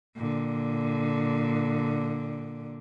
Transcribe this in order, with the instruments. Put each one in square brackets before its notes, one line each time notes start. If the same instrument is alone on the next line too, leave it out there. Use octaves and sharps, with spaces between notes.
[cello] A#2 D3